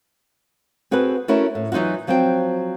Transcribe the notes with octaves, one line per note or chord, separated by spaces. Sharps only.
C4 F#4 G#4 A4 B4
A3 C#4 E4 F#4 A#4
A2
E3 F#3 D#4 F4 F#4
F3 F#3 C4 C5 G5